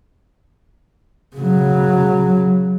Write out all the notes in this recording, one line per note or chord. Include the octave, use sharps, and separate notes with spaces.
C#3 F#3